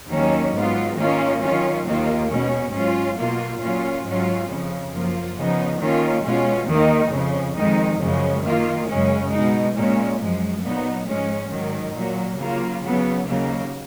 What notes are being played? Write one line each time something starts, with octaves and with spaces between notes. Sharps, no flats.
D#2 D#3 F#3 A#3 C#4
G#2 F#3 B3 F4
D#3 A#3 C#4 F4
D#3 F#3 C#4 F4
D#2 D#3 A#3 F4
B2 G#3 C#4
G#2 F#3 C#4 F4
B2 A#3 F4
A#2 F#3 C#4 F4
G#2 F#3 C#4 F4
F2 C#3 F3
F#2 F3 A#3 F4
C#3 F3 B3 D#4
D#3 A#3 C#4 F4
B2 G#3 C#4 F4
D#2 D#3 A#3 D#4
F2 C#3 F3
F2 D#3 G#3 D#4
F#2 C#3 F3 G#3
D#3 A#3 F4
F#2 C#3 G#3 C#4
B2 G#3 D#4
A#2 G#3 C#4
F#2 F3 G#3
A#2 F#3 B3 D#4
G#2 F3 G#3 C#4
G#2 D#3 F#3
A#2 F#3 A#3
C#3 F#3 A#3 F4
C#3 F#3 B3
D#2 C#3 F#3 A#3